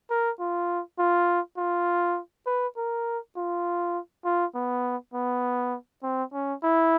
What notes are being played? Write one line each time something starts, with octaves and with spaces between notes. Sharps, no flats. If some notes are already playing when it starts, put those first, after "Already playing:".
A#4
F4
F4
F4
B4
A#4
F4
F4
B3
B3
C4
C#4
E4